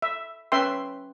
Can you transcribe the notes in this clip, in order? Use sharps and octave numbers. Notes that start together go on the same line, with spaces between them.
E5
C#4 B4 E5 G5 C6